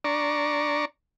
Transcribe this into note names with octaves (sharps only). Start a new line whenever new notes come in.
D4 D5 A#5 C#6